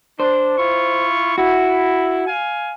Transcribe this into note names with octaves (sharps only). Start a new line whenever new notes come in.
D4 C5
E4 F4 C#6
E4 F#4
F5 G#5